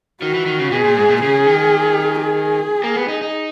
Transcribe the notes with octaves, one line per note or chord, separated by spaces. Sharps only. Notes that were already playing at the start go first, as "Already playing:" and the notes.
D#3 F#4
E3
D#3
C#3
B2 G#4
A#2
G#2
A#2
C#3 G#4
D#3
G#4
A#3
B3
D#4
D#4